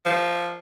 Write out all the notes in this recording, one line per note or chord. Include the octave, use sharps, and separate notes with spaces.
F3